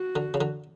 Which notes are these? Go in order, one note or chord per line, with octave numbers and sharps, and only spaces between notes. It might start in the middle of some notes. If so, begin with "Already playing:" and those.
Already playing: F#4
D3
C#3
D3